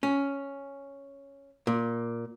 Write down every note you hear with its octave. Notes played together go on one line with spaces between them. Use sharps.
C#4
A#2